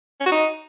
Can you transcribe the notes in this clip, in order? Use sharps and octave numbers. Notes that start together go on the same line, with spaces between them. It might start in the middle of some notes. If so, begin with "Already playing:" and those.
C#4
F#4
D#4